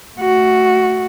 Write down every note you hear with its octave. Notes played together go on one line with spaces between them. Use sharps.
A3 F#4